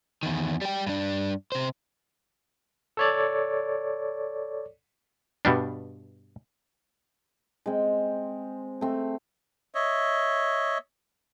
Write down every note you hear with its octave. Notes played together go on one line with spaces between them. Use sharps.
E2 D#3
G3 G5
G2 D4
C3 C5
A4 C#5 D5
G2 B2 G3 D4
G#3 C4
A3 C4
C#5 D#5 E5